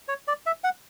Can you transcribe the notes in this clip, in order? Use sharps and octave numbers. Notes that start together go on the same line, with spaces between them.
C#5
D5
E5
F#5